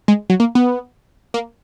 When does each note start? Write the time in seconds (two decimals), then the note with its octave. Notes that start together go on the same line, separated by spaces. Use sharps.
0.08 G#3
0.30 F#3
0.40 A#3
0.55 B3
1.34 A#3